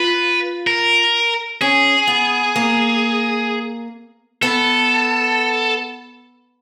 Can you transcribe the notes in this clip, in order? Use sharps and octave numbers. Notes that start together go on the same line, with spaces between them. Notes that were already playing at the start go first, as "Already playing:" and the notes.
Already playing: F4 B4
A#4
C#4 G#4
B3
A#3
B3 A4